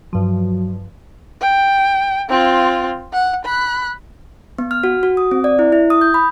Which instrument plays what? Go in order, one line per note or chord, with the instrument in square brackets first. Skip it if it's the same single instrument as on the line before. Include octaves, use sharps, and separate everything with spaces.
[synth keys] G2 F3 [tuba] F#3
[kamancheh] G5
C4 F4
F#5
B5 F#6
[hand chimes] B3
F6
F#4
F#4
D#6
C4
D5
E4
E4
D#6
G6
B5